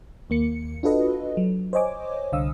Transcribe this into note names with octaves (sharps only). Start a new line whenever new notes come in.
D#2 A#3 C#7
D4 F4 F#4 A4 B4 D#5
F#3
C5 C#5 D#5 G#5 D6
C2 D3 F5 D#6 E6